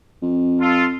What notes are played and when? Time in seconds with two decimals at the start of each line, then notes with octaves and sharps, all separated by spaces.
0.22 F2
0.60 F4 A4